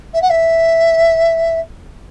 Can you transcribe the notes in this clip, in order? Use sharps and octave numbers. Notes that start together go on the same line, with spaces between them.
E5
F#5
E5